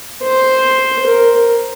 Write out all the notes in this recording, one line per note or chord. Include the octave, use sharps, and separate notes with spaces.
C5
A#4